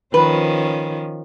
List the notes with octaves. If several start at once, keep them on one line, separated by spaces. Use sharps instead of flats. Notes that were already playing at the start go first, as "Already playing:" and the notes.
D#3 F3 C#4 B4